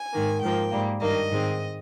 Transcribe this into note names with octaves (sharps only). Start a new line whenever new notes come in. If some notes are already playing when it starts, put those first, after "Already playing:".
Already playing: G#5
G#2 D#3 A#3
G#2 F3 A#3 G5
G#2 G3 A#3
G2 D#3 A#3 D#5
G#2 D#3 G#3 C4